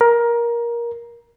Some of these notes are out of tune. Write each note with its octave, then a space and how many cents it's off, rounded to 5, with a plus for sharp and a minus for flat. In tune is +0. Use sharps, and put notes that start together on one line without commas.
A#4 +15